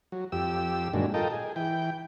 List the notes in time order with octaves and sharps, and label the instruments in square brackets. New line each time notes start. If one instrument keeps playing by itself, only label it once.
[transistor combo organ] F#3
F2 G4 E6
G2 A#2 D3 D#3 F#3 G#3
F4 A4 A#4 D#5 G5
G#4
E3 G5